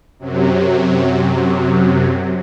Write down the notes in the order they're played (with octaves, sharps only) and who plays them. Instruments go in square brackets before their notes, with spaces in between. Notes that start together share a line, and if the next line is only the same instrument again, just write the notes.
[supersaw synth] F#2 C3 F#3